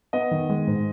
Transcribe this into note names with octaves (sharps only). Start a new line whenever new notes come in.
B3 D#5
D#3
G#3
G#2